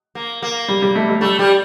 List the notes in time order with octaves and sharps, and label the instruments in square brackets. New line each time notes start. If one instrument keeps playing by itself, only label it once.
[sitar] A#3
A#3
[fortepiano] G3
G3
A3
A3
[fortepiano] G3 [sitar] A3
[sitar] G3